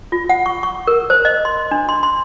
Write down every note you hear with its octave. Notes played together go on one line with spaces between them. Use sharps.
F4
F#5
C#6
C#6
A#4
C5
D#5
C6
D4
C6
C6